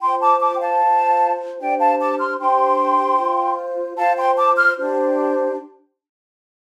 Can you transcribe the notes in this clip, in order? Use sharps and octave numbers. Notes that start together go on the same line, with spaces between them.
F4 C5 G5 C6
A5 D6
A5 D6
G5
F5 A5
F4 C5
D4 G4 C5 D5 G5
F5 A5
A5 D6
C6 F6
D4 G4 C5 G5 C6
F4 C5
F4 C5 F5 A5
G5 C6
A5 D6
C6 F6
D4 G4 C5